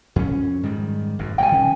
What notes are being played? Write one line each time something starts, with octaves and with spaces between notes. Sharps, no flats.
F2 C#4
G#2 D#3 G3
G#1 F#2
B2 F3 G3 G5 G#5
D#3 C#4